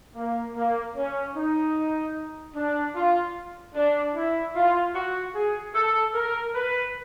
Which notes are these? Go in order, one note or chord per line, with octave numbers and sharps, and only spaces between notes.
A#3
A#3
C#4
D#4
D4
F4
D4
E4
F4
F#4
G#4
A4
A#4
B4